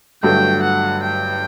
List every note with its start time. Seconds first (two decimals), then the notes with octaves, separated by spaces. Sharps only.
0.23 G1 G2 F#3 A3 G5
0.63 F#5
1.04 G5